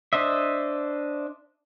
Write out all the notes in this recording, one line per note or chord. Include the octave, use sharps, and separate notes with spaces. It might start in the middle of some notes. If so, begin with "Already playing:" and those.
D4 C5 D#5 E5